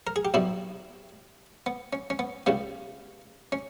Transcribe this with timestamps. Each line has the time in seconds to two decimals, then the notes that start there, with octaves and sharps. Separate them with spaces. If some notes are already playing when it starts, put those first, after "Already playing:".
0.07 A#4
0.16 G#4
0.25 G4
0.34 B1 B2 G3 E4
1.66 B3
1.93 C#4
2.10 C#4
2.19 B3
2.46 C#2 C#3 G3 B3
3.52 C#4